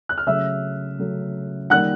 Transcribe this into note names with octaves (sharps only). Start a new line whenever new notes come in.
F#6
F6
C#3 F#3 A3 E5 E6
C#3 F#3 A3
D#3 G3 A#3 F#5 F#6